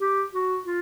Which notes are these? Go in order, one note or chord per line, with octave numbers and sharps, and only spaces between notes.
G4
F#4
F4